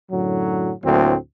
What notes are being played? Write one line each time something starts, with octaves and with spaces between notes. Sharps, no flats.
F#2 A2 D3 F#3
D2 A2 D3 F#3 A#3 C4